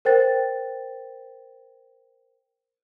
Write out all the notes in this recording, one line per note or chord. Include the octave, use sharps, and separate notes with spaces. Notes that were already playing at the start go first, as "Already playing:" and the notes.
A#4 C5 G5 A6